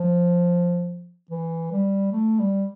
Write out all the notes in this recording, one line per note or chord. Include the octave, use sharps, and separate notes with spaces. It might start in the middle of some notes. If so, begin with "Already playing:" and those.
Already playing: F3
E3
G3
A3
G3